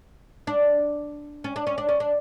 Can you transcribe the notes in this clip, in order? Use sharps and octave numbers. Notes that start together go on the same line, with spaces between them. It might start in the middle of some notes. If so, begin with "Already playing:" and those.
D4
C#4
D4
C#4
D4
C#4
D4